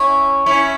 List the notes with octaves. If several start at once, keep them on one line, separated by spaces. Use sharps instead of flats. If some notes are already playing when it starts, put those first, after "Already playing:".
Already playing: C#4 E4
C#4 E4